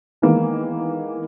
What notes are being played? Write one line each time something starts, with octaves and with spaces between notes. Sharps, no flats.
D#3 E3 G#3 A#3 B3